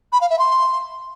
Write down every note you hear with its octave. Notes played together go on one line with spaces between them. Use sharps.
B5
F5
E5
C6